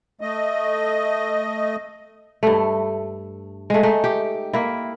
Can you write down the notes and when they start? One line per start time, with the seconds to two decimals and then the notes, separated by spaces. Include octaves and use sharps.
0.21 A3 D#5
2.43 G2 A3
3.70 G#3 A3
3.83 A3 D#4
4.04 G4
4.53 A#3 E4